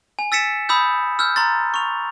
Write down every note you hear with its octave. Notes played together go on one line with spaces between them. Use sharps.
G#5
E6 A6 B6 C#7 E7
B5 D#6 E6 G6
E6 F6 G6
A#5 C6 A6
C#6 F7